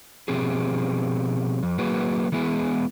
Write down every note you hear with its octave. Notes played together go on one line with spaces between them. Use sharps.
B2 F3 C4 G4 G#4
F2
F#3 A#3 F#4 G#4 B4
E3 G#3 B3 E4 G#4